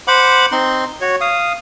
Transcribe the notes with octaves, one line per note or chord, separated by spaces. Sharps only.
C5 F#5 B5 D6
C4 D#4 C6
F#4 C#5
F5 D#6